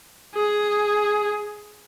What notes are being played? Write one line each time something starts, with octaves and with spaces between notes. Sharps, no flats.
G#4